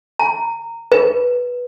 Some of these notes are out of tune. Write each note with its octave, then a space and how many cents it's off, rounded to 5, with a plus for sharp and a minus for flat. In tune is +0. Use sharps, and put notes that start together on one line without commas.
A#5 -20
B4 -10